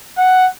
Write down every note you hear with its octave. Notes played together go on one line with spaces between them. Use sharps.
F#5